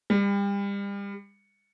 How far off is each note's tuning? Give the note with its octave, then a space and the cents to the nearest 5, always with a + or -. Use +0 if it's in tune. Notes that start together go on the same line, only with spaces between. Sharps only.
G3 +35